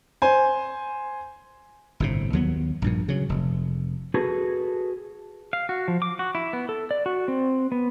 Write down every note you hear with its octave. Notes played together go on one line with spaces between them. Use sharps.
C5 G#5
G1 A2 C3
D#2 F#3 B3
A#1 G2 A#2
C#3 F#3
F1
F#4 G#4 A4 B4
F5
F#4
F3
D6
F#4
E4
B3
A4
D5
F#4
C4
B3